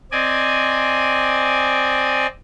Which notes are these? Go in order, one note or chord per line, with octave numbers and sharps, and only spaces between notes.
C4 D5 D#5 G#5